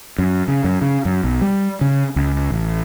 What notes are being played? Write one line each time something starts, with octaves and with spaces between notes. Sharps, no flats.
F#2
C#3
F#2
C#3
F#2
B1
G3
C#3
C#2
A1